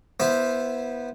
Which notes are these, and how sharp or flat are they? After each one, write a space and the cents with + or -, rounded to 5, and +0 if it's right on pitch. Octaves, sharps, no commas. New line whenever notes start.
B3 -15 E4 +0 C5 +0